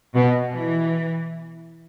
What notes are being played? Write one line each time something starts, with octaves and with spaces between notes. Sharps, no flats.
B2
E3